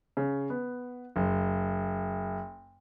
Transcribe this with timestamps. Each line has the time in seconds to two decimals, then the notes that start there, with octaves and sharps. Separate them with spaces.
0.17 C#3
0.50 B3
1.16 F#1